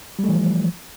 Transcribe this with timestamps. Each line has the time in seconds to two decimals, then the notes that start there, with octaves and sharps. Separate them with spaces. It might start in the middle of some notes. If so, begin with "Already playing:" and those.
0.19 G3
0.24 A3
0.29 E3
0.34 F3